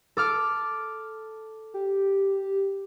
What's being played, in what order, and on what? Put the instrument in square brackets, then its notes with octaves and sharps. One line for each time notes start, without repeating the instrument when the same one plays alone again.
[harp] A4 D6 F6
[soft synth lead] G4